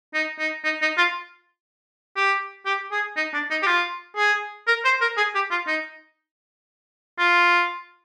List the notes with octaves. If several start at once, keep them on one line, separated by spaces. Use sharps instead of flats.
D#4
D#4
D#4
D#4
F4
G4
G4
G#4
D#4
D4
D#4
G4
F4
G#4
A#4
C5
A#4
G#4
G4
F4
D#4
F4